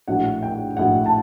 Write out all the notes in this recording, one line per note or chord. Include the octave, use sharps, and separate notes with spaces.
A#1 A2 F#3 F#5
G5
A#1 A2 F#3 F#5
A5